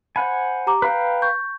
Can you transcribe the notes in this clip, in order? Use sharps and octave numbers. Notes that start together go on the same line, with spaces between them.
C5 F#5 G#5 B5
G4 A#5 D6
B4 F5 G5 A#5
C#6 G6